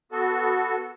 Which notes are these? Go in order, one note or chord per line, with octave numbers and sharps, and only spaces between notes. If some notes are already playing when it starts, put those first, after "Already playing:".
B3 F#4 A4